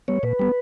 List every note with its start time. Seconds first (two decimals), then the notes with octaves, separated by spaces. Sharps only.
0.08 G3 B3 C#5
0.23 A#2 B4
0.39 G3 B3